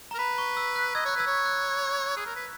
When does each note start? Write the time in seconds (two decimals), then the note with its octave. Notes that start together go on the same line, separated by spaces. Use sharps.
0.11 A#5
0.15 A#4
0.18 B4 B5
0.38 C#6
0.57 E6
0.76 F#6
0.95 D#5 E6 G#6
1.05 C#5 F#6
1.16 B4 E6 G#6
1.26 C#5
1.46 F#6
2.17 G#4
2.26 A#4
2.36 B4